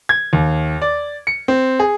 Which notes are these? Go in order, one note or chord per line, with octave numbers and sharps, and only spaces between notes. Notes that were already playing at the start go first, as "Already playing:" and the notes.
G#6
D#2
D5
C#7
C4
G#4